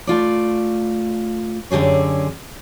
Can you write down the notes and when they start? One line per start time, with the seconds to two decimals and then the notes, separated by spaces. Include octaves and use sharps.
0.07 A3 F4 D5
1.70 F#2 D3 G4 G#4 C#5